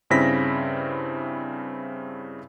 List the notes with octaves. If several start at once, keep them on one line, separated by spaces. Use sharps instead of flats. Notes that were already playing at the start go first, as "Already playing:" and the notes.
G2 C#3 C4 E4 A#6 B6